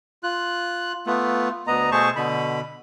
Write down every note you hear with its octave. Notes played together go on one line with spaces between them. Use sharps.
F4 F#6
A3 B3 F4
D2 B3 D#5 A#5
B2 A3 G#4 C5 A5 C#6
B2 D3 B5